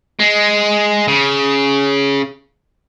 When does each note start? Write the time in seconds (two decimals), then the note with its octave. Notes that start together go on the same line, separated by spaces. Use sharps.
0.19 G#3
1.08 C#3